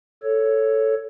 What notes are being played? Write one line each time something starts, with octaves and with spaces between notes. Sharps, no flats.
A4 C#5